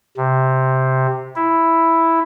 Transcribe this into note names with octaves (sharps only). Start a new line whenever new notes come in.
C3
E4